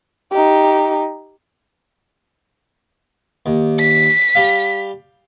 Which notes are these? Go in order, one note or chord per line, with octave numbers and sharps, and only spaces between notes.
D#4 G4
D#2
B6
G3 F5